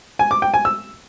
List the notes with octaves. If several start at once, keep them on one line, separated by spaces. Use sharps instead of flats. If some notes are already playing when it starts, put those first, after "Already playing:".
G#5
D6
G5
G#5
E6